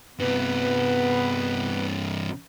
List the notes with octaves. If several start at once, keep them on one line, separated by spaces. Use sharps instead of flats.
G2 C3 B3 B4